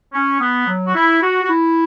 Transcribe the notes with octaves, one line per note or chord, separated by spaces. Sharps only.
C#4
B3
F#3
F#4
E4
F#4
F#4
E4